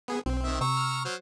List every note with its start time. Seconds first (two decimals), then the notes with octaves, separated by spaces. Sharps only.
0.08 B3 G#4
0.26 B1 C4
0.43 D#3 E5
0.61 C3 A#5 C#6 E6
0.77 F6
1.05 F#3 C5